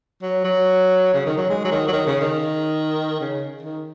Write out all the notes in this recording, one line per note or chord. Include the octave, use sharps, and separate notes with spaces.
F#3
F#3
C#3
D#3
F#3
G#3
F#3
D#3
F#3
D#3
C#3
D#3
C#3
D#3